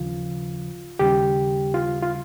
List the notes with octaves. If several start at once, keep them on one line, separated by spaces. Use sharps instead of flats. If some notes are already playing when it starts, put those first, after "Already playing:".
Already playing: D#2 C#3 F3 F4
D#2 C#3 G3 G4
F4
F4